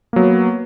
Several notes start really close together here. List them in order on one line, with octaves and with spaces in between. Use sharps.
A#3 F#3 B3